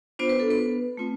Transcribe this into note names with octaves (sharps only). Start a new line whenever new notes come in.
B3 D4 F4 C5
B4
A4
B3 B4
A3 C4 F4